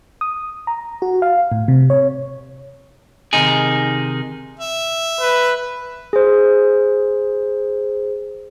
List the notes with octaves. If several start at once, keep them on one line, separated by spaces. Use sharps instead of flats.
D#6
A#5
F#4
F5
A2
C3
C#5
C3 D#3 D#4 G#4
E5
B4
G#4 C5